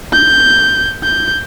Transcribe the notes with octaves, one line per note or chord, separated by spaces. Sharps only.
G6
G6